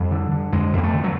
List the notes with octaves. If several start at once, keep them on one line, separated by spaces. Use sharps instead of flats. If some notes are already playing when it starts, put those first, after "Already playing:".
Already playing: F2 G3
D3
D3
F2 G#3
F2 A#3
A3
D3
F#3